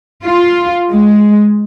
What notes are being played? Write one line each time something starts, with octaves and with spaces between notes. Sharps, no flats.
F4
G#3